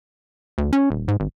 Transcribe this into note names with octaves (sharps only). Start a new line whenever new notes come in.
D2
C#4
D#1
G#2
G#1